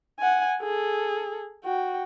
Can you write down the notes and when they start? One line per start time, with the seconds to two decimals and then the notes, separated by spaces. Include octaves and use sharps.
0.20 F#5 G#5
0.62 G#4 A4
1.64 F#4 G5